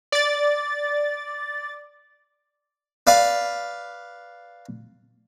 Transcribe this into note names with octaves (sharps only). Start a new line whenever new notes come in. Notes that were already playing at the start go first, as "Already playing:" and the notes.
D5 A6
B4 D5 F5